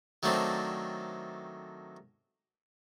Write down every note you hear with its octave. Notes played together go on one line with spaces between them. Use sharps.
D#3 F#3 A3 C4 D4